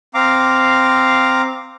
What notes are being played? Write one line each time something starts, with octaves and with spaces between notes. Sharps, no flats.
C4 F5 A#5 D6